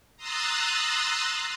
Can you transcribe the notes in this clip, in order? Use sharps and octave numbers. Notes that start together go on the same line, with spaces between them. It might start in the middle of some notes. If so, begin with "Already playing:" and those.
A#5 C6 D#6 E6 F#6 A6